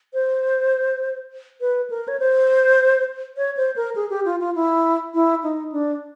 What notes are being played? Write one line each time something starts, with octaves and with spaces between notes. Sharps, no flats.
C5
B4
A#4
C#5
C5
C#5
C5
A#4
G#4
G4
F4
F4
E4
E4
D#4
D4